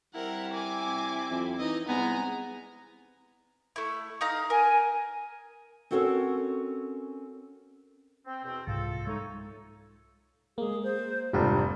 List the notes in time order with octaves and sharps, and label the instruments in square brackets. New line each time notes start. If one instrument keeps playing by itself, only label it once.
[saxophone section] G3 C4 E4 [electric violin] A#4 F#5
[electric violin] G#5 D6
[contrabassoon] C2
F2
[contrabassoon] E3 [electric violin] D#4 D#5
[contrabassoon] C2 [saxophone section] G#3 B3 [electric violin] G#5 A#5
[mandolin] A3 E4
D#4 F5 A#5
[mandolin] A#4 [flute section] G#5
[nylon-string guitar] C4 C#4 F#4 A4 A#4 C#5
[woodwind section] C4
E2 B2 C4
[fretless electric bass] C2 G#2 [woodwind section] F4 A4
[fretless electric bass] G#3 [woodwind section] A3 D#4 C#5
[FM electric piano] G#3 A#3 [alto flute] G#4
[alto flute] C5
[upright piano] F1 G3 [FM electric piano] G#2 D4 F4 [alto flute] D5